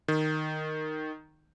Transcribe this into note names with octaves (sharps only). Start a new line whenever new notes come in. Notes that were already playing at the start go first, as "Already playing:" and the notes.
D#3